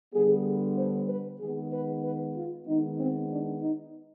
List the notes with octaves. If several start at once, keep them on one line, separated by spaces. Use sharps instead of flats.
D3 G3 B3 G#4
C5
B4
D#3 G#3 B3 G#4
B4
B4
F4
D#3 G#3 B3 D#4
C4
D4
D#4